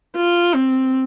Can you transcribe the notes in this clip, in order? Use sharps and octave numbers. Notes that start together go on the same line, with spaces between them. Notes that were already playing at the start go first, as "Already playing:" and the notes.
F4
C4